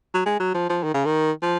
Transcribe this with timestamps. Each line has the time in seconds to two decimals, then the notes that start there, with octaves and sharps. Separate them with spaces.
0.14 F#3
0.26 G#3
0.40 F#3
0.54 F3
0.70 F3
0.83 D#3
0.94 C#3
1.05 D#3
1.43 F3